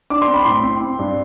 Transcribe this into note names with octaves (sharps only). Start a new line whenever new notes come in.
D4 D6
C6
C4
B5
A2 C6
C4
C4
G2